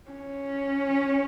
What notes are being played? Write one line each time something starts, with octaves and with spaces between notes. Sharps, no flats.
C#4